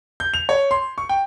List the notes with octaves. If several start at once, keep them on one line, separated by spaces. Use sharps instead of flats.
G6
F7
C#5
C6
C#6
G5